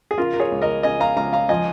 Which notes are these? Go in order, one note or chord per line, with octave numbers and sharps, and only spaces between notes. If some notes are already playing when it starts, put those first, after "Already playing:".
G#4
C#3 F4 A#4
A#4
G#4 C#5
C#2
A#4 D#5
C#3 D#5 G#5
F5 A#5
C#2 F5 A#5
F5 A#5
F3 D#5 G#5